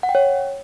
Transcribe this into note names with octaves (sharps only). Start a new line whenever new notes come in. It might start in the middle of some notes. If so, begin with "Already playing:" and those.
F#5
G5
C#5